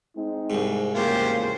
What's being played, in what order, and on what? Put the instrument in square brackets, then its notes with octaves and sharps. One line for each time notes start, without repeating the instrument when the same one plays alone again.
[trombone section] G#3 C4 D#4
[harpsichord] C2 G#2
[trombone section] E2 A2 A#3 [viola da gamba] C#3 C5 [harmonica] F#3 F4 G4